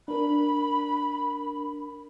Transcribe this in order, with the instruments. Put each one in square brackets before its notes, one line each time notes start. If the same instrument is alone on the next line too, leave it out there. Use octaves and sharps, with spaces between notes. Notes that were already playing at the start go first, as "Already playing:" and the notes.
[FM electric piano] D4 A#4 [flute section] B5